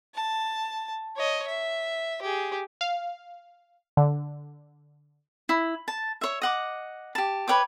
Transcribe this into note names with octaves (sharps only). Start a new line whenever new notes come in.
A5
C#5 D#5
E5
G4 G#4
F5
D3
E4
A5
C#5 E5
D#5 F#5 D6
G4 A5
B4 C#5 G5 D6